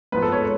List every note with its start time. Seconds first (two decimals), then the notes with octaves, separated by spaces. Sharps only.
0.12 G#2 F3 G#3 B3 F4 B4
0.22 A4
0.32 C#5